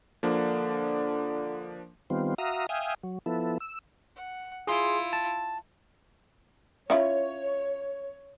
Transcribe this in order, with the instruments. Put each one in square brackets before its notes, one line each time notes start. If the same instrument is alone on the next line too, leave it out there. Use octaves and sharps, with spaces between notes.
[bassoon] D3 [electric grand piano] F3 A#3 D4
[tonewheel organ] D#3 G3 B3 C4 F4
F#4 E5 F5 A#5 D#6
E5 F5 G5 G#5 D#6
F#3
F3 B3 E4 A4
E6
[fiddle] F#5
[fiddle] E4 F4 [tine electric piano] G#4 C6
[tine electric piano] A5
[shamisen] C#4 E4 F4 [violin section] C#5